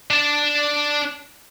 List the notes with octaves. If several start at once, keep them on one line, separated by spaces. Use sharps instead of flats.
D4 A5